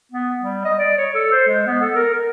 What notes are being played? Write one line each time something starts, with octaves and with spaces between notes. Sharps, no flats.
B3
G3
D#5
D5
C#5
A4
C5
G#3
B3
A4
A#4
A#4